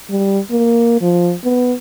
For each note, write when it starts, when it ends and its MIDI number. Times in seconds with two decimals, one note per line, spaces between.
0.10 0.40 55
0.51 1.01 58
1.02 1.34 53
1.44 1.74 59